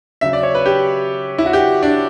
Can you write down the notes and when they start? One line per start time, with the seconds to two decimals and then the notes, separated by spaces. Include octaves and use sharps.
0.21 C#3 F#3 E5
0.33 D5
0.43 C#5
0.55 B4
0.66 G4
1.38 E4
1.46 F#4
1.53 G4
1.82 D4